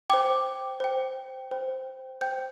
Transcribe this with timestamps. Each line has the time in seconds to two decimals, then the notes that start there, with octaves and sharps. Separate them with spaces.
0.10 C5 G5 D6
0.80 C5 G5
1.51 C5 G5
2.21 C5 G5 G6